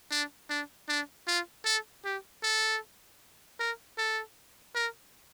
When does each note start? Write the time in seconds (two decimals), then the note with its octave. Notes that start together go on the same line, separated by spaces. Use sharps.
0.11 D4
0.49 D4
0.88 D4
1.27 F4
1.65 A4
2.05 G4
2.43 A4
3.59 A#4
3.98 A4
4.75 A#4